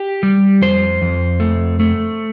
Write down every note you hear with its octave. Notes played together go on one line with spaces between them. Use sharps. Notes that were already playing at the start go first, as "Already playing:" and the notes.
Already playing: G4
G3
F2 C5
F2
A3
A3